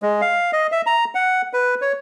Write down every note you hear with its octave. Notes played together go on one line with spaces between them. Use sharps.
G#3
F5
D#5
E5
A#5
F#5
B4
C#5